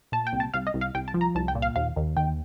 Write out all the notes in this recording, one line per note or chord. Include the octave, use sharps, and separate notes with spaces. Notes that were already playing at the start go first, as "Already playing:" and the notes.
A#2 A5
G5
C2
A5
C2 F5
D#5
C2
F5
C2 G5
A5
F3
A#5
C2 A5
G5
A#2
F5
D#2 F5
D#2
D#3 G5